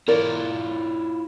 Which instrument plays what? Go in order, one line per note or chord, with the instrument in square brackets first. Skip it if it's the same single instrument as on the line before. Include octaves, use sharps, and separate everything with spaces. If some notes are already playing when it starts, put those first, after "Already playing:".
[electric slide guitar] E4 F4 C#5 [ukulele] A#4 D5